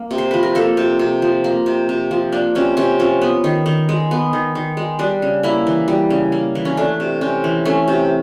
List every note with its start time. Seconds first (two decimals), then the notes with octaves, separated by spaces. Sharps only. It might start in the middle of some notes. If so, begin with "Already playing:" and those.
Already playing: A#3
0.11 C3
0.18 C5
0.31 F3 B4
0.43 A#4
0.55 A#3 A4
0.77 C3
0.99 C3
1.22 F3
1.44 A#3
1.66 C3
1.89 C3
2.11 F3
2.32 A#3 D4
2.55 C3 C#4
2.77 C3 C#4
2.99 F3 C#4
3.21 B3
3.44 D#3
3.66 D#3
3.89 G#3
4.11 B3
4.33 D#3
4.55 D#3
4.77 G#3
4.99 G3 D4
5.22 C#3
5.43 A#3 E4
5.67 E3
5.88 G3
6.10 C#3
6.32 A#3
6.55 E3
6.65 C#4
6.77 A3 D4
7.00 C3
7.21 C3 C#4
7.44 E3
7.65 A3 C#4
7.88 C3